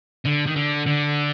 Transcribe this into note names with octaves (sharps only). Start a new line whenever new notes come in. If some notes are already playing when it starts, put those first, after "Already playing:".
D3
D#3
D3
D3